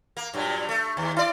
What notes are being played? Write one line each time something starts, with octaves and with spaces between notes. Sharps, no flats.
A#3
G2 A#2 F#3
A3
D#2
E4 D5